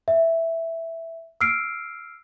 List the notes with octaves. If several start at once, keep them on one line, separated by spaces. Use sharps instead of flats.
E5
E6 F6 C7 D7